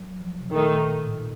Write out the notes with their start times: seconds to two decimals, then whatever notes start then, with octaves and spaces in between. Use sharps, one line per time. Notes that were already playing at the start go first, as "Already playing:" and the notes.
Already playing: F#3
0.20 F3
0.40 C3
0.50 A#2 D#3 A3 D#4
1.02 A2
1.14 A#2